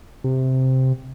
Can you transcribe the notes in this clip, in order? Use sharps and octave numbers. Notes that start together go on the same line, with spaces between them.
C3